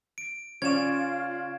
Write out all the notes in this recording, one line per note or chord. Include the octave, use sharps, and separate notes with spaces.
D7
C#3 C#4 F4 D5 C#6 G#6 E7